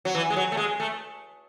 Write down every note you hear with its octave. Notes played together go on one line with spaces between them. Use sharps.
F#3
E3
G#3
F#3
A3
G#3
A3